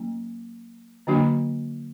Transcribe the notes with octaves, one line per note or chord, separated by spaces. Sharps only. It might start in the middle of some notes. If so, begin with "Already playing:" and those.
Already playing: F#3 A#3 C#4
D3 F#3 A#3 D4 F#4